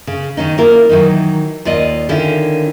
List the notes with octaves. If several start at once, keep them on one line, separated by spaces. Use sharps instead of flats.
C#3
D#3 C#4 D#4
A#3 E4 F4 A#4
D#3 E3 F#3 D#4
D#2 F4 D5 D#5
D3 D#3 C#4 E4 F4